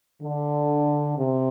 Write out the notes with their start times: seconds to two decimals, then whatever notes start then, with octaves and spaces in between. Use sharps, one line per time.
0.22 D3
1.17 C3